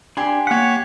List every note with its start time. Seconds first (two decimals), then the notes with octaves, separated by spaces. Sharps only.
0.17 D4 G4 G#5 C6
0.47 A#3 C#5 F#5 B6